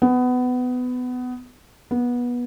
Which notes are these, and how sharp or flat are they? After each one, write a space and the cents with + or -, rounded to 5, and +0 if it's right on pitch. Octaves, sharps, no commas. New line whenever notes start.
B3 +20
B3 -20